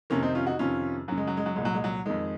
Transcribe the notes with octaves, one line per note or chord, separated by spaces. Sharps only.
F2 C3 D#3 A#3 C#4
C4 D#4
C#4 F4
D#4 F#4
F2 C3 D#3 C#4 F4
F#2 C#3 F#3
G#3
F#3
G#3
F#3
C2 A#2 G#3
F#3
G#3
F#3
F2 D#3 G#3